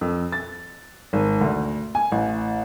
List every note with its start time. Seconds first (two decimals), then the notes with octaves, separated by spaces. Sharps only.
0.01 F2
0.32 A6
1.13 G#1
1.41 D2
1.95 G#5
2.12 A1